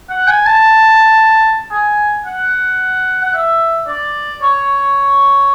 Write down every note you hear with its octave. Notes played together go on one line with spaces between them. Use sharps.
F#5
G#5
A5
G#5
F#5
F#5
E5
D5
C#5